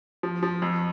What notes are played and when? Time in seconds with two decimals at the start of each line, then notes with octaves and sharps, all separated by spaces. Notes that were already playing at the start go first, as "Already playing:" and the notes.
0.23 F3
0.43 F3
0.62 F2